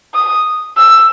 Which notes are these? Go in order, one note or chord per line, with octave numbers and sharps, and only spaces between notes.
D#6
E6